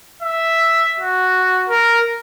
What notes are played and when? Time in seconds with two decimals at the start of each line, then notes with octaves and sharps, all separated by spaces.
0.22 E5
1.00 F#4
1.69 A#4